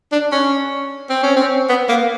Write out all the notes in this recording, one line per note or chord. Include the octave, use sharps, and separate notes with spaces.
D4
C#4
C4
C#4
C4
B3
A#3